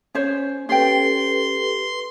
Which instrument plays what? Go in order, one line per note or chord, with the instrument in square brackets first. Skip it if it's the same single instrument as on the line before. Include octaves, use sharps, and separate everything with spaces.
[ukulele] C#4 C5 C#5
[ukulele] C#4 G5 [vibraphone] G4 A4 B4 [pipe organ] C6